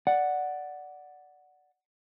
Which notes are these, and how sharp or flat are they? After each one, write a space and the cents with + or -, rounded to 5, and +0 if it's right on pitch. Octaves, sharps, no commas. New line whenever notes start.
D5 +0 F#5 +0